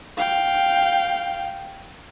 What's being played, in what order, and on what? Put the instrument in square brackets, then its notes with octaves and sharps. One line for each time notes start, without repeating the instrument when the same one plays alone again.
[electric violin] F5 G5